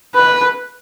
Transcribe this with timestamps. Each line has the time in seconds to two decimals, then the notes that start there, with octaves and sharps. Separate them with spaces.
0.15 B4